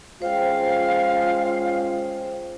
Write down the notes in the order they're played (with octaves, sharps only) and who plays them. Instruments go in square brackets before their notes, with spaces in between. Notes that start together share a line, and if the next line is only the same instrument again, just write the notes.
[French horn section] G#3 C#4 F4 [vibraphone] C5 G5 [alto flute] F5